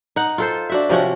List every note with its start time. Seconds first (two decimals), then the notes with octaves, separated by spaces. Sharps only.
0.16 D#4 F#5
0.38 F4 A4 C5
0.69 D4 F#4 E5
0.89 C3 F3 C#4 F#4